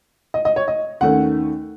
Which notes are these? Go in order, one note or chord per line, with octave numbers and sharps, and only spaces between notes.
D#5
D#5
C#5
D#5
D#2 D#3 A3 C#4 F#5